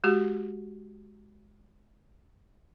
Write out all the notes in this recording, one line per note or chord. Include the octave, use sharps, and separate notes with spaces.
G#3 F#4 G4